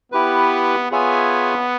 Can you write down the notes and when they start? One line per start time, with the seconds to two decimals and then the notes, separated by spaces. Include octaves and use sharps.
0.12 B3 E4 G4 B4
0.91 B3 F4 G#4 C#5 E5 G#5